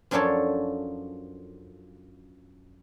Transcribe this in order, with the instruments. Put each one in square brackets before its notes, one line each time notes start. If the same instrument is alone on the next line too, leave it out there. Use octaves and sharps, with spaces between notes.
[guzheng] F#2 F3 D4 A4 C#5 A5